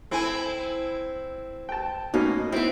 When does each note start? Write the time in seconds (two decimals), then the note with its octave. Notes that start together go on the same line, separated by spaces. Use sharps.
0.11 C4 E4 A4 G#5
1.69 G5 A5
2.14 B2 A#3 C#4 D#4
2.52 B3 C4 E4